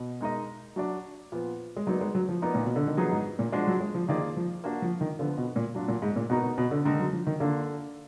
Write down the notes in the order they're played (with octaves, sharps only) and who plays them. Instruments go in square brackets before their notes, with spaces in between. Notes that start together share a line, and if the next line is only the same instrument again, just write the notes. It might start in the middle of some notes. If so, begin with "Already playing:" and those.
Already playing: [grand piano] B2
[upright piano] G#3 D#4 A#4 D#5
F#3 D4 F#4 D5
A#2 F3 B3
[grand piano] G#3
[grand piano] F#3 [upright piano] B3 D#4 A#4 D5
[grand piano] G#3
F#3
F3
[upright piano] B3 D#4 A#4 D5
[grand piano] A#2
B2
D3
D#3
[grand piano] F3 [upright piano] F#3 B3 D#4 G#4
[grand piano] G#2
A#2
[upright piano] F3 G#3 D4 F#4 D5
[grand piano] F#3
G#3
F3
[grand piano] D#3 [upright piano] F3 A#3 F4 G#4 D5
[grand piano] F3
[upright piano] A#3 D4 F#4 D5
[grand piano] F3
D#3
[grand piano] D3 [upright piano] F3 B3 F4
[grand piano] B2
A#2
[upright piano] F#3 D4 F4
[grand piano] A#2
G#2
A#2
[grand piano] B2 [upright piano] B3 D#4 A#4
[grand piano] B2
B2
D3
[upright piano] D3 G#3 D#4 A#4 [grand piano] D#3
[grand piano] F#3
F3
D#3
[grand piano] D3 [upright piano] A#3 D4 F4